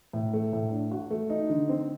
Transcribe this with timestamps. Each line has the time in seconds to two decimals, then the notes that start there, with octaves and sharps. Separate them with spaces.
0.13 A2
0.33 A3
0.53 A2
0.72 D4
0.91 F#4
1.10 A3
1.30 D#4
1.50 D3
1.69 C4